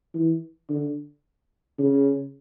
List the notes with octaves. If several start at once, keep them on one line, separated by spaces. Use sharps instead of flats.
E3
D3
C#3